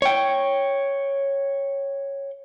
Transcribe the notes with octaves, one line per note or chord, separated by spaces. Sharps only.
C#5 G5